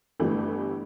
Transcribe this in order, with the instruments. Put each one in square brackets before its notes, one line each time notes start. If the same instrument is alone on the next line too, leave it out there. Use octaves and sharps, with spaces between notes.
[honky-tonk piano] G1 E3 A3 G4